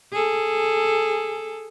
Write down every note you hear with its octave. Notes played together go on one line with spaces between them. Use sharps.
G#4 A4